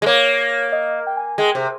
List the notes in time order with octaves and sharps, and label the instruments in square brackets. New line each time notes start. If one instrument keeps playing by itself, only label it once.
[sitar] G#3
[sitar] A#3 [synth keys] C#5
[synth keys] D#5
G5
G#5
[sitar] G#3 [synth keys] G5
[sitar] C3